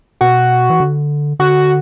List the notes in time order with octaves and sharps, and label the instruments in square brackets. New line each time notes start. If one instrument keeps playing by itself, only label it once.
[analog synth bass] B2 [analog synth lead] F#4
[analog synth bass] E3
D3
[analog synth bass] D3 [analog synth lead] F#4